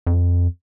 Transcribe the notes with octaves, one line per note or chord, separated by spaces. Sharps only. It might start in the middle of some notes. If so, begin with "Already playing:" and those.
F2